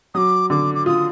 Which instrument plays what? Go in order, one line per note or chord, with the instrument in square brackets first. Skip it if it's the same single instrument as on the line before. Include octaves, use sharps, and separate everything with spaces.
[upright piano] F#3 [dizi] D6 D#6
[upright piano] D3 [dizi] D6
[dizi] D6
[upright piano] F4 [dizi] D#6